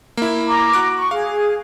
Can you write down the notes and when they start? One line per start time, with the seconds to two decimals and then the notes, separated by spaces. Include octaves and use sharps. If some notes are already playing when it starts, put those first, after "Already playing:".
0.17 A#3 E4
0.48 A#5 D6
0.73 F#4 F#6 D7
0.98 C#6
1.11 G#4 F5